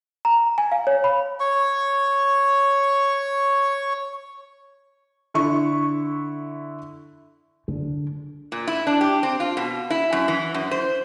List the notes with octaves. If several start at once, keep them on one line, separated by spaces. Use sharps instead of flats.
A#5
G#5
F5
C#5
B5
C#5 C#6
D3 E4 C#6
D3
A#2
E4
D4
G4
C4
F4
B2
E4
F#2
E3
F#2
C5